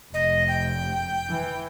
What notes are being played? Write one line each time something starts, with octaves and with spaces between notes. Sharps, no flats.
F1 D#5
G5
E3